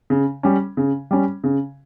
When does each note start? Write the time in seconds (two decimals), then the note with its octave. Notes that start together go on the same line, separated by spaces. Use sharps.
0.10 C#3
0.43 G3 C#4
0.77 C#3
1.11 G3 C#4
1.44 C#3